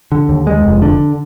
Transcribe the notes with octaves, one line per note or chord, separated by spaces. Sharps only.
D3
D#2
G#3
F1
D3